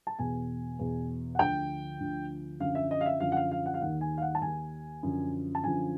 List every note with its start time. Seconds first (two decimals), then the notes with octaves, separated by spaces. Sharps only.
0.07 A5
0.19 E2 B2 G#5
0.79 E2 B2
1.35 F#5
1.39 D2 D3 F3 G5
2.00 D2 D3 F3
2.60 F#2 D3 F3 F5
2.75 E5
2.91 D#5
3.01 F5
3.06 E5
3.20 F#2 D3 F3 F5
3.32 F#5
3.36 F5
3.51 F5
3.66 F#5
3.74 F5
3.81 D#2 D#3 F#5
4.01 G#5
4.18 F5
4.22 F#5
4.35 A5
4.42 D#2 D#3 G#5
5.03 F#2 D3 F3
5.55 A5
5.63 F#2 D3 F3 G#5